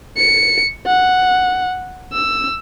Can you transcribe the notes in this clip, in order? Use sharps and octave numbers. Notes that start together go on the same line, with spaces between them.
C#7
F#5
E6